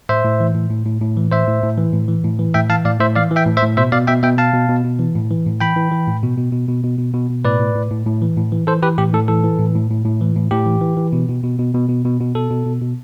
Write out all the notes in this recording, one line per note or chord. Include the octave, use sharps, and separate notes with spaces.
A2 C5 E5
A2
E3
A2
A2
A2
A2
E3
A2 C5 E5
A2
A2
E3
A2
E3
A2
E3
A2 E5 G5
E3 F5 A5
A2 D5 F5
A2 C5 E5
E3 D5 F5
E3
E5 G5
A2
C5 E5
A2
B2 C5 E5
B2 D5 F5
B2 E5 G5
B2 E5 G5
B2 F5 A5
B2
B2
B2
E3
A2
E3
A2
E3 G5 B5
E3
E3
A2
B2
B2
B2
B2
B2
B2
B2
B2
A2 B4 D5
A2
A2
A2
A2
E3
A2
E3
E3 A4 C5
E3 G4 B4
A2 G4
A2 A4
E3 A4
E3
A2
A2
A2
A2
E3
A2
A2 G4
E3
E3
E3
B2
B2
B2
B2
B2
B2
B2
B2
B2 A4
B2
B2
B2